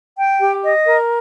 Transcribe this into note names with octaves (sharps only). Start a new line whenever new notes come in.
G5
G4
D#5
A#4